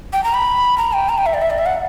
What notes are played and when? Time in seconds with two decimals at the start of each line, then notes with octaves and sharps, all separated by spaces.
0.13 G5
0.24 A#5
0.34 B5
0.78 A#5
0.93 G5
1.09 A#5
1.18 G5
1.26 E5
1.34 D5
1.42 E5
1.50 D5
1.58 E5
1.66 F#5